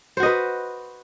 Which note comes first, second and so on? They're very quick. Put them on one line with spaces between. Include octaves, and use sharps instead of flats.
C5 F#4 D#5 B4